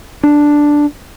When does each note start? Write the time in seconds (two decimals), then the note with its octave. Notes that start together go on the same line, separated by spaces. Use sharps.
0.23 D4